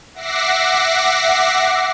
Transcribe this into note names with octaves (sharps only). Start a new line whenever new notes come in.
E5 F#5 D6 A#6 C7